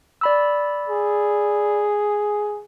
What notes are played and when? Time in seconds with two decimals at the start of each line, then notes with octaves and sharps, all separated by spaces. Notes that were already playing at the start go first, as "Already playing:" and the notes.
0.21 D5 B5 E6
0.88 G#4